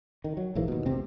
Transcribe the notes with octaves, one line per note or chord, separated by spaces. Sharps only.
D#3
F#3
A#1 G#2 E3 A#3
D#2 B2
F1 A#1 C3 C4